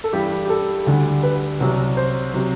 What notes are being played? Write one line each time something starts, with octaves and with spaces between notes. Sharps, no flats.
A4
G2 E3 G3 G4
G4
A4
D2 D3 G3
B4
C2 C3 F#3
C5
C3 F#3